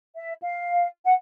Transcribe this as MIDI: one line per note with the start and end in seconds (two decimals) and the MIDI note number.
0.16 0.33 76
0.43 0.87 77
1.04 1.14 78